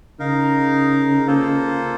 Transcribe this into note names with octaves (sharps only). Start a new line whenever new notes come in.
C#3 D#4 A#4 F5
A#3 F4 A4 C5